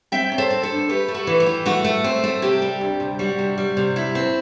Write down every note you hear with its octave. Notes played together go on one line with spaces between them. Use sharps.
C4 E5 G5
F#3
A4 C5
C4
A4 C5
G2
A3 G4 B4
A3
F#4 A4
E3
G4
E3
A3 F#4
A3
C4
A3
C3 G4
G3
D2
C3
G3 F#4
C3
G3
C3
E4
C4